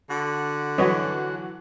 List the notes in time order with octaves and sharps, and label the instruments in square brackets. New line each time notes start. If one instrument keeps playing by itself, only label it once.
[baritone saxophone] D3 [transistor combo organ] F#4
[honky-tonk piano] E3 F#3 F#5 [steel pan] B4 C#5 D#5